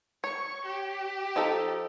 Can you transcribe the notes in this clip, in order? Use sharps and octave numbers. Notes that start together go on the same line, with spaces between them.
C#5 C#6
G4
F3 D#4 A4